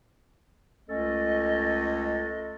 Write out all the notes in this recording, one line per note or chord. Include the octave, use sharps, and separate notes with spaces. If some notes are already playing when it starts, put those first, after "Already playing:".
C#2 A3 C#4 A4 D#5